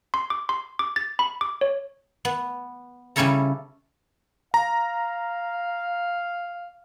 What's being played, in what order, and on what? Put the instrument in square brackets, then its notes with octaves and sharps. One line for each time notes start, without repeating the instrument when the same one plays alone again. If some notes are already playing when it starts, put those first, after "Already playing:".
[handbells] C6
D6
C6
D6
A6
B5
D6
C#5
[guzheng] B3
C#3 G3 C#4 E4 A4 A#5
[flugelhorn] F5 [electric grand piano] A#5